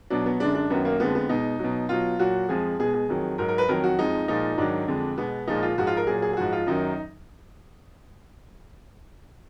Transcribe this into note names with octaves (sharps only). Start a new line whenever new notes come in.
B2 F#3 D4
B3
F#2 D3 G#3 D4
D4
F#2 D#3 F#3 B3
A#3
F2 D3 F3 G#3 B3
B3
B2 G#3 D#4
B2 F#3
B2 F#3 F4
A#2 F#3 F#4
F2 F3 G#3 G#4
B2 G#3 G#4
G#4
F2 D#3 F#3
G#2 F#3 A#4
A#4
B4
F2 D#3 F#3 A#4
F#4
F2 F3 G#3 D#4
A#2 F3 G#3 D#4
G#2 D#3 F#3 D4
F2 D3 G#3
B2 G#3 B3
A#2 F3 G#3 D#4
F4
G#2 F3 G#3 F#4
F4
A#4
A#2 F#3 G#4
G#4
G#4
G#2 F3 G#3 F#4
F4
F#2 D#3 F#3 D#4